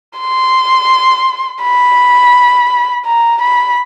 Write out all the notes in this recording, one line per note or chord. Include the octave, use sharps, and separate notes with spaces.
C6
B5
A#5
B5